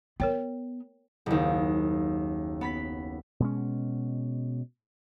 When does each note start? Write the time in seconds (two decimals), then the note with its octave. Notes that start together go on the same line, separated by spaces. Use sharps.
0.20 B3 A#4 C#5 G5
1.26 F#1 D#2
2.61 B3 B5 B6
3.40 B2 G#3 C#4